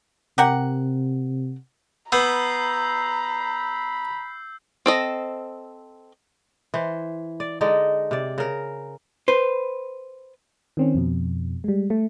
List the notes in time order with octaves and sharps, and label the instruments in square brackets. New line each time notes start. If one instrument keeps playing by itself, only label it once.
[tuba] C3 [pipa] G4 A#4 F#5
[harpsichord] B3 [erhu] A#5 [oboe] B5 [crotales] E6 G6 C7
[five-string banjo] C4 A4 D#5
[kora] E3 C5
D5
D3 G#3 D#4 D5
C3 D5
C#3 A#4
[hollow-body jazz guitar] B4 C5
[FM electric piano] D#3 C4 C#4
F2 B2
G3 G#3
A3